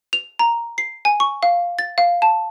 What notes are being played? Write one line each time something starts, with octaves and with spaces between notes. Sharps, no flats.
F7
A#5
C7
G#5
C#6
F5
A6
F5
A5